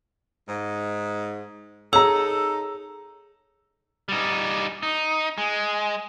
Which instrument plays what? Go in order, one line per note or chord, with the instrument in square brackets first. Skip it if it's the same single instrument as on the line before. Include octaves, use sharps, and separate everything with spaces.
[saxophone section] G#2
[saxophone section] D#4 A4 [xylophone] G#4 C#5 [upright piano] A#5 E6
[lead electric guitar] G3 D#4
D#4
G#3